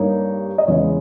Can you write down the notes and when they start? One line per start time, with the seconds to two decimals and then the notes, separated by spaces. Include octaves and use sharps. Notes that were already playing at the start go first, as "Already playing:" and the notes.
Already playing: G2 G3 A#3 D#4 C#5
0.58 D#5
0.67 E2 C#3 G#3 C#5